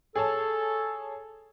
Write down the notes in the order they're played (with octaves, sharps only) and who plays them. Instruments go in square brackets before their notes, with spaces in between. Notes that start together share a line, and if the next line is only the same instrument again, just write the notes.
[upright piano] G#4 C#5 A5 [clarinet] A4